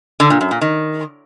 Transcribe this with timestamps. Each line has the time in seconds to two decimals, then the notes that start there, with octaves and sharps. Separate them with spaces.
0.20 D3
0.30 A#2
0.41 F#2
0.51 A#2
0.61 D#3